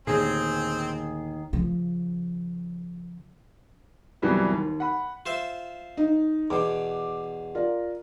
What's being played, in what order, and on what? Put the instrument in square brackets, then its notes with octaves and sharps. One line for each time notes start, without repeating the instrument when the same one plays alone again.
[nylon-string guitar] D#2 D#3 [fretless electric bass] A#2 D3 A3 [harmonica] C4 [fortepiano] G#4
[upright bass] C#3 F3
[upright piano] C2 F2 E3 F#3 G3 B3
D#2
F#5 B5
[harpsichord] F4 C5 E5
[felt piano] D#4
[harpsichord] E2 B2 [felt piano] D6
[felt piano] F4 A#4 D5